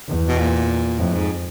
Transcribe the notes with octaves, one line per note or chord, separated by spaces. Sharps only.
E2
B2
A#2
F2 A2
G#2